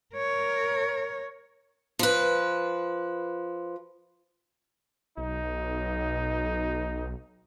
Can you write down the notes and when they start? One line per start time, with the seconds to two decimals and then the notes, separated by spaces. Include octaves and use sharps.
0.15 A#4 C#5
1.99 F3 B4
5.18 B1 D#4